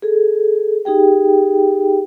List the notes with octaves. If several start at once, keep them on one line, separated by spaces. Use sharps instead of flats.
G#4 A4
D#4 G4 G#4 G5